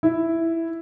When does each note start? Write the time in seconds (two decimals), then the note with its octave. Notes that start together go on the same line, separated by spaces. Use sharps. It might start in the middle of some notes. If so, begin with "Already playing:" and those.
0.03 E4